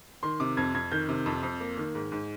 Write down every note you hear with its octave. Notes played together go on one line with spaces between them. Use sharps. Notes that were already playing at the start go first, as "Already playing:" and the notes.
D#3 C6
C3 D6
F2 G#6
F2 G#6
D#3 G6
C3
F2
F2
A#3
D#3
G#2
G#2